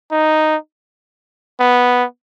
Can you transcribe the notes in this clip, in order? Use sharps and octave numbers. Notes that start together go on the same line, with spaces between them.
D#4
B3